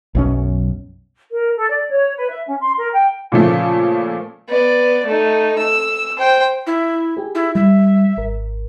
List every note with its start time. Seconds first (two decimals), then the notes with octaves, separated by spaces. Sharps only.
0.15 B1 F#2 C#4
1.31 A#4
1.57 A4
1.70 D5
1.89 C#5
2.17 B4
2.30 E5
2.47 C#4
2.60 C6
2.78 A#4
2.92 G5
3.32 A#2 C#3 F3 A3
4.49 B3 D5
5.06 A3 D#4
5.59 E6
6.18 C5 G5
6.67 E4
7.17 G4 G#4
7.35 E4
7.55 G3 E5
8.17 G#1 A#4